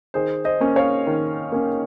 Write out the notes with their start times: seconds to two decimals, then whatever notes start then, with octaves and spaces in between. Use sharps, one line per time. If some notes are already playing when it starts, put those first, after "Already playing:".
0.14 D#3 G#4 C5
0.45 C5 D#5
0.60 A#3 C#4
0.76 C#5 F5
1.07 D#3
1.52 A#3 C#4